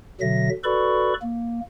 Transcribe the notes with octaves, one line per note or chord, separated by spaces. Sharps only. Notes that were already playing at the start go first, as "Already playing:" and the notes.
B2 D3 F#3 E5 A#6
F#4 A4 B4 D5 B5 C#6
A#3